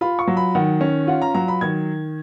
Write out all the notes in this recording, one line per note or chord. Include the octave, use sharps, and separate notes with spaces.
F4 B5
C#6
F#3
B5
D#3 F#5
C#4
F4 F#5
A#5
F#3 A#5
B5
D#3 G#6